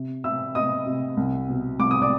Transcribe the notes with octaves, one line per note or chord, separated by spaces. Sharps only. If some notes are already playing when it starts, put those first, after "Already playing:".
Already playing: C3
C3 E5 E6
C3 D#5 D#6
C3
C2
B2
C2 D6
D#6
D5 D6